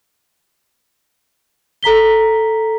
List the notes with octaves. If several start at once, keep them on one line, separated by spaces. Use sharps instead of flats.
A4 A#5 B6 G7